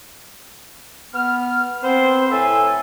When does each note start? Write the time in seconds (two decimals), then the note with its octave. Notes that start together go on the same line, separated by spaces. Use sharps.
1.13 B3 F6
1.82 B3 C4 C5
2.30 A2 A4 E5 G#5